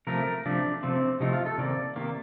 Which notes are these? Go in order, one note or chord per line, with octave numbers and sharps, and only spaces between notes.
C3 F3 A3 A#4
C3 F3 A3 D4
C3 F3 A3 C4
C3 F3 A3 D#4
F4
A4
C3 D#3 A#3 D5
C3 D#3 A#3